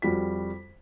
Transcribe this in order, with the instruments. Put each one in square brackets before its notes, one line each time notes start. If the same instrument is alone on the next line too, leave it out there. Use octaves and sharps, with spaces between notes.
[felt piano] F2 G3 F4 F#4 B6